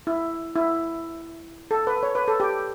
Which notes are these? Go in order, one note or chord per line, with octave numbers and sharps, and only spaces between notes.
E4
E4
A4
B4
C#5
B4
A4
G4